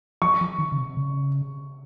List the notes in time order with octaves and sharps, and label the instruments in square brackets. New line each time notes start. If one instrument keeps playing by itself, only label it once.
[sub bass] F3 [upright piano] C#6
[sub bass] F3
D#3
C#3
C3
C#3